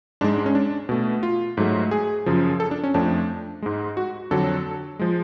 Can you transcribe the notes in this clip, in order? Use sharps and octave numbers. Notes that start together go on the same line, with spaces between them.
G#2 G#3 D4
D4
C#4
D4
B2 A3
F4
G#2 F#3 A3
G#4
F#2 C#3 F3
A4
D4
C#4
F2 F3 A3 D4
G#2 G#3
F#4
F2 D3 F#3 A4
F3 G#3